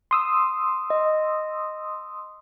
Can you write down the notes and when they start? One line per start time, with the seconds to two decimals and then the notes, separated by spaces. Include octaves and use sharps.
0.11 C6 D#6 E6
0.90 D#5